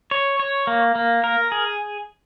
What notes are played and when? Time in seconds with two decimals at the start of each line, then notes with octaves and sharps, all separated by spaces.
0.11 C#5
0.40 C#5
0.67 A#3
0.95 A#3
1.24 A#4
1.52 G#4